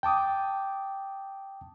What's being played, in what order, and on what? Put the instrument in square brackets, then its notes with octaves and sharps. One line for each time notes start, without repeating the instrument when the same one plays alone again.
[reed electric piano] G5 A5 D6 D#6